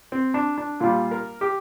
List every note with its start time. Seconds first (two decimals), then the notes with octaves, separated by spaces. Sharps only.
0.12 C4
0.34 D4
0.58 D4
0.80 A#2 G3 F4
1.11 A#4
1.41 G4